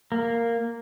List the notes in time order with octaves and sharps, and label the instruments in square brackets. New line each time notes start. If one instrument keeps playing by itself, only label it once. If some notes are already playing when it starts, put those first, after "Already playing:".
[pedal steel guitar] A#3